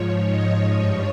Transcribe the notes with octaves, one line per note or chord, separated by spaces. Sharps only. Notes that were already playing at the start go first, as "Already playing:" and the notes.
Already playing: G#2 F3 C#5
D#5
G2 F3 C#5